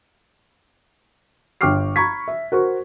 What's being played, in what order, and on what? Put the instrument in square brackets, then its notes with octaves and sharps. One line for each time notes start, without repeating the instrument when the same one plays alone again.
[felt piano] G1 G5 C#6 D6 F6 C7
A#5 B5 C#6 G#6 B6
E5
F#4 A#4 C5 C#6